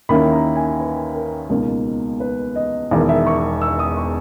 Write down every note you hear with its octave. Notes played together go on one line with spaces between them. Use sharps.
D#2 D#3 A#3 C#4 E4 B5
A#5
G#5
B4
A#4
C#2 B2 A#3 D#4 A#4
B4
D#5
E1 E2 D#3
E5
C#6
E6
D#6
C#6